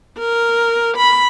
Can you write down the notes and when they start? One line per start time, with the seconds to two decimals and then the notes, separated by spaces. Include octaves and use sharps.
0.19 A#4
0.97 B5